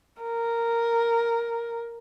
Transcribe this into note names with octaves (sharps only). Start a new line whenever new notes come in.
A#4